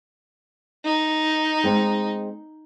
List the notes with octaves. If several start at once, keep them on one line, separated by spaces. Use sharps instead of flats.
D#4
G#3 C4